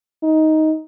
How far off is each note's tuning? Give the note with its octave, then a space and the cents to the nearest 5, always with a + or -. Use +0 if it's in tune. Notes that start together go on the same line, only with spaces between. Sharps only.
D#4 +10